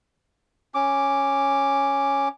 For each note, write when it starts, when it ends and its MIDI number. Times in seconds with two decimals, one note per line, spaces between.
0.75 2.28 61
0.75 2.28 86